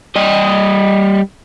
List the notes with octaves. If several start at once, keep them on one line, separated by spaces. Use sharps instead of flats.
G3 D#5